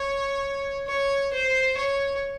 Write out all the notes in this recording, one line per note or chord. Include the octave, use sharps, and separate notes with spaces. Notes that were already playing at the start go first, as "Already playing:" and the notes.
Already playing: C#5
C#5
C5
C#5